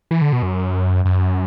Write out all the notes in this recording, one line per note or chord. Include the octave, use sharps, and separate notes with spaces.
E3
D3
B2
F#2
F#2